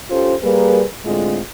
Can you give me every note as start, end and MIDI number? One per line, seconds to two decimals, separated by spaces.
0.10 0.35 61
0.10 0.35 65
0.10 0.35 67
0.10 0.35 69
0.10 0.35 72
0.42 0.83 55
0.42 0.83 58
0.42 0.83 68
0.42 0.83 70
0.42 0.83 71
1.05 1.40 45
1.05 1.40 50
1.05 1.40 56
1.05 1.40 60
1.05 1.40 65